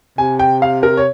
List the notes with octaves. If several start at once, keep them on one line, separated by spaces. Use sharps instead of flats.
C3 G#5
G5
F5
A#4
C#5